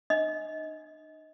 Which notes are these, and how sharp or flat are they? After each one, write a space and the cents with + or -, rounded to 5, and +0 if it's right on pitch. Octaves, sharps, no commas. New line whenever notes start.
D4 +45 D#5 +25